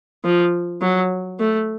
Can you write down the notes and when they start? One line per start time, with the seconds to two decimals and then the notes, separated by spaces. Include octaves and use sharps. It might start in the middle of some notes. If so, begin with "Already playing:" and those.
0.24 F3
0.81 F#3
1.39 A3